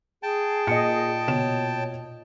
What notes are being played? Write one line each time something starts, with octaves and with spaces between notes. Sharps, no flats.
G#4 G5 A5
A#2 D#5 C#7
B2 C#5 E7